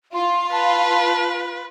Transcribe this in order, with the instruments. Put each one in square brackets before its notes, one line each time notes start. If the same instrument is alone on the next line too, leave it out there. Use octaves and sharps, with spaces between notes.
[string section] F4 [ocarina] C6
[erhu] B4 [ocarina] A5